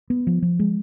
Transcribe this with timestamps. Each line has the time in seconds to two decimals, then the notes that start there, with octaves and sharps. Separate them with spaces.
0.10 B3
0.27 F3
0.42 F3
0.59 G#3